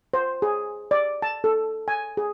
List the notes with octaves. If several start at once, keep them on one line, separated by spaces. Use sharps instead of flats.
C5
G#4
D5
A5
A4
G#5
G#4